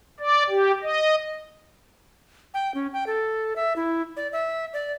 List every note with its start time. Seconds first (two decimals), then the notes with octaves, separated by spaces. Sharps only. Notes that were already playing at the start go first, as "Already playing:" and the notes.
0.20 D5
0.49 G4
0.82 D#5
2.54 G5
2.75 C#4
2.93 G5
3.07 A4
3.56 E5
3.76 E4
4.17 D5
4.33 E5
4.73 D5